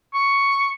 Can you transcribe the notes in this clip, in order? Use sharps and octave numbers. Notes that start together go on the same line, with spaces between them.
C#6